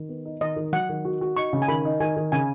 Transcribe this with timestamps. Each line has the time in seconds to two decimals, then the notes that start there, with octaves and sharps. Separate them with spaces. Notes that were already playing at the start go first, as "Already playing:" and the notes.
Already playing: D#3
0.09 B3
0.25 D#4
0.41 D#3 D#5
0.56 D#3
0.73 F#3 F#5
0.89 D#3
1.05 F#4
1.21 F#4
1.37 D#4 C#6
1.53 C#3
1.62 G#5
1.68 D#3 B5
1.85 D#4
2.00 D#3 G#5
2.17 D#3
2.32 C#3 G#5